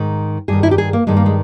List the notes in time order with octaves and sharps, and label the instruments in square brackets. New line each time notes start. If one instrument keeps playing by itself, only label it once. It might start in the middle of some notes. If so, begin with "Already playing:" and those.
Already playing: [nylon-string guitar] G#2 D#3
G2 D#3 G#4
E4
G4
G#4
A#3
G2 D#3 G#3
A#3
G#3